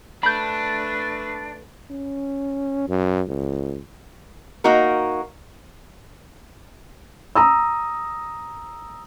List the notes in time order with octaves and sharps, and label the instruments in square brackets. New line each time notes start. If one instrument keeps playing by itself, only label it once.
[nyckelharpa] A3 B4 [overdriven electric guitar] D4 [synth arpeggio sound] B5 G6
[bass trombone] C#4
F#2
C#2
[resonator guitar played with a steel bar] A#3 D#4 F#4 A#4
[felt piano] A#5 D#6 E6